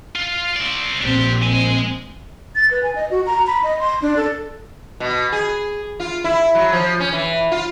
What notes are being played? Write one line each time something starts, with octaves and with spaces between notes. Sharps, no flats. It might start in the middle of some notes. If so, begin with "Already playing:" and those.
F4
C4 D5
A#1 C4 D4 G4
G#3 G#5
A6
B4
G#5
D#5
F#4
A#5
B5
D#5
C6
D4
A4
B2
G#4
F4
E4
F#3
F3
C#4
E3
F4